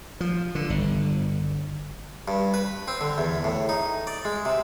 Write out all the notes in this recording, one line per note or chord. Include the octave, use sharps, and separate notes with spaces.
F3
D3
G1
G2
B4
C4
D3
E2
A2
D#4
D5
G#3
C3